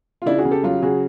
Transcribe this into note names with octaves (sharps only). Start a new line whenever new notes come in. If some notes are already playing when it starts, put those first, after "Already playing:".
F4
C#3 D4 E4
F#4 G#4
C#3
G4 A4
F#3 F4 G4
C#3 F#4 G#4